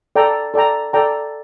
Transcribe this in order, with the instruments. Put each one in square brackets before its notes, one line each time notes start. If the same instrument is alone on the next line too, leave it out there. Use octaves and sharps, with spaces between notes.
[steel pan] A4 D5 G5 A#5
A4 D5 G5 A#5
A4 D5 G5 A#5